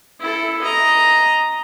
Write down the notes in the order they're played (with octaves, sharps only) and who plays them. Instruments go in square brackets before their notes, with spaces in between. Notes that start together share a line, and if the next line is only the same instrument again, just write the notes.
[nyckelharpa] E4 A4
D#5 A#5